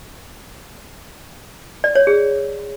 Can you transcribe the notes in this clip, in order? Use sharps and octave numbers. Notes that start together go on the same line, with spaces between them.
D5
C#5
G#4